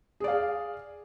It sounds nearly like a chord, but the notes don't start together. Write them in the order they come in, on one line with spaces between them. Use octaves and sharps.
G#4 D5 F5